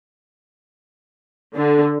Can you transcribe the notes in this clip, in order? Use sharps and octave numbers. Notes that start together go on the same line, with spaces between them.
D3